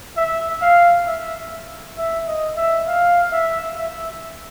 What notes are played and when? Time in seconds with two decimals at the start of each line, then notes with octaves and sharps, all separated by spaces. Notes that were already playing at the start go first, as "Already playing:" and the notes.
0.17 E5
0.62 F5
1.07 E5
1.98 E5
2.27 D#5
2.57 E5
2.87 F5
3.32 E5
3.78 E5